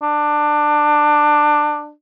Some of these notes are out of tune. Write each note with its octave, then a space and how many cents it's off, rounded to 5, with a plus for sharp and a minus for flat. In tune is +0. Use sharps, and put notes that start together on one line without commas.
D4 +20